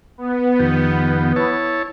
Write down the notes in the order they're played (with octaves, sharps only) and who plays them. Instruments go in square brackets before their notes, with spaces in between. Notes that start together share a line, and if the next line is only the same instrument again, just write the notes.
[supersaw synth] B3
[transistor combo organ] F2 D#3 G4
E4 C#5 A5